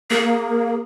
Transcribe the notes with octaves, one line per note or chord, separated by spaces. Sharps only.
A#3 G#4